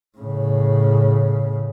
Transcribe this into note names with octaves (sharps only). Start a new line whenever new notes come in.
A2 C#3